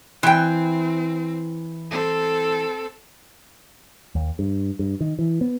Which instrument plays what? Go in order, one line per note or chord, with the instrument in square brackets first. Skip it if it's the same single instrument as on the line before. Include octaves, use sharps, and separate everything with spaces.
[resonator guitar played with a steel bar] E3 G5 [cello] C4
[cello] C4 A4
[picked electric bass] D#2
G2
G2
D#3
E3
B3